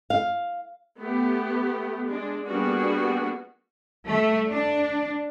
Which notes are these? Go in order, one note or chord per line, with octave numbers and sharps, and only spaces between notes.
F5
A3 B3 G4
G#3 D4
G3 A#3 B3 D4 F#4 G#4
A3
D4